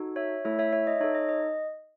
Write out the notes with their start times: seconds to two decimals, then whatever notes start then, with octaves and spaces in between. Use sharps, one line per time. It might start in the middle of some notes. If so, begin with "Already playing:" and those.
Already playing: D#4 F#4 A4
0.16 C#5 E5
0.45 A3 E4 A4 C#5 E5
0.59 C#5 E5
0.73 C#5 E5
0.87 D#5
1.01 D#4 A4 C#5
1.15 D#5
1.29 D#5